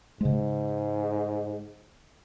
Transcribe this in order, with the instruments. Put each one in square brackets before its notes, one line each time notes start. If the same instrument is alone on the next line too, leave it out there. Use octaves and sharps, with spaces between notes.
[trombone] G#2 [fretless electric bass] C#3 G#3